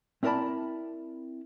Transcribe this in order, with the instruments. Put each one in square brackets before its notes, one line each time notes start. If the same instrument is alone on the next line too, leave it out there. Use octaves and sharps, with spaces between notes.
[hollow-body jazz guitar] C4 E4 A#4 D5 A5 B5